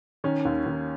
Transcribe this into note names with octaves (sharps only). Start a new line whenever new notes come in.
D#3 C#4
D#2
D#2